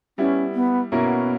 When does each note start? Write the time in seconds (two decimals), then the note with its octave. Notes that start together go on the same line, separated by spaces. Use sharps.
0.18 G3 B3 C#4 E4
0.54 B3
0.91 B2 A#3 B3 C#4 E4 A#4